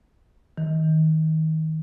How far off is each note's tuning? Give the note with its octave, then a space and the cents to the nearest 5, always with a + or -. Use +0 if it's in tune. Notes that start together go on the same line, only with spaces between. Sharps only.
D#3 +25